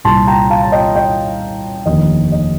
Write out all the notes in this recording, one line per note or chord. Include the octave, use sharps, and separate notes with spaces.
C2 A#2 G3 A5 C6
G5 A#5
F5 A5
A5
D#5 G5
D#5 G5
F1 D#2 D3 F3 A#3 D#5
D#5